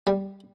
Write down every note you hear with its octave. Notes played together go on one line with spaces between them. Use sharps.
G3